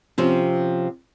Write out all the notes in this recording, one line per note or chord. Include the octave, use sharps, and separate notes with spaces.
C3 F3 C4 C#4